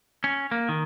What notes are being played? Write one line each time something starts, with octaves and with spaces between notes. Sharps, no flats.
C#4
A#3
D#3